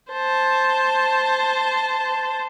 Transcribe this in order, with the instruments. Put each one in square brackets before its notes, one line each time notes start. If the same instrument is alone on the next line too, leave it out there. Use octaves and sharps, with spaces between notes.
[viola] C5 A5